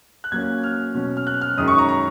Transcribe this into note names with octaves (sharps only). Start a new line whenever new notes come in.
F#6
A#2 F#3 A#3 C#4 G#6
F6
B2 F#3 C#4
F6
F#6
F6
F#2 D#3 G#3 C#4 D#6
C#6
A#5
A#5